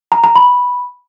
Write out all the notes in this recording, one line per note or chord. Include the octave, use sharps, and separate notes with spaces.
A#5
A#5
B5